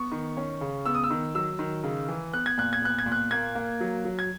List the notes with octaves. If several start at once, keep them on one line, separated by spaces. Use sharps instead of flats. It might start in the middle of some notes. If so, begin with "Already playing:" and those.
Already playing: B3 C#6
D#3
C#4
C#3
B3 E6
D#6
E6
D#3
F#3 E6
D#3
C#3
E3
B3 F#6
G#6
A#2 F#6
G#6
B3 F#6
G#6
A#2
F#6
A#3 G#6
A#3
F#3
F#3
G#6